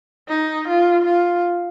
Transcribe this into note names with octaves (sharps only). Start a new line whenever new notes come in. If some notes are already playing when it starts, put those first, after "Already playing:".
D#4
F4
F4